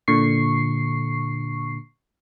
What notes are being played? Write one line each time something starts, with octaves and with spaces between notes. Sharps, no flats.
A#2 D3 C#6 C7